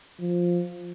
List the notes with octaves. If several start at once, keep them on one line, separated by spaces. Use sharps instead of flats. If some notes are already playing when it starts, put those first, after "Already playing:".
F3